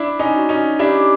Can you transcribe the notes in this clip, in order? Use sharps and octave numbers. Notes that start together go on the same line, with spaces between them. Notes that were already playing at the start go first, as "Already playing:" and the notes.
Already playing: D4 E4
C#4 D#4
F#4
C#4 D#4
D4 E4 G4